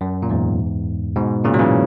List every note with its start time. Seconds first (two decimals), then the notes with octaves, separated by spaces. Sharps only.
0.01 F#2
0.23 A#2
0.29 E2 G#2
1.16 G#2 B2
1.45 A#2 C#3
1.54 F#3
1.59 C#3 E3